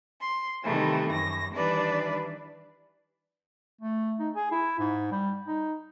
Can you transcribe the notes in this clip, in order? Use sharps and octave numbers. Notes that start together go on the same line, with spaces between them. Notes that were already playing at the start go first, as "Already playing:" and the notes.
C6
C3 D#3 E3 G3 A3
F#2 A#6
D#3 E3 G3 D4 B4 D5
A3
D#4
G#4
E4
G#2
G3
D#4